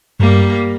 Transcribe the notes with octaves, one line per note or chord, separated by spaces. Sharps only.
G2 G3 A#3